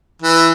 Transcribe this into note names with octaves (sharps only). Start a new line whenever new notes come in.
E3